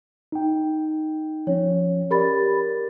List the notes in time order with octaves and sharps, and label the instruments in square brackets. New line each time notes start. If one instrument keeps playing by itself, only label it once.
[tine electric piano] D#4 G5
[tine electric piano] F3 C#4 [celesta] C#5
[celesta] G4 B5 A6 [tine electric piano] A#4 D5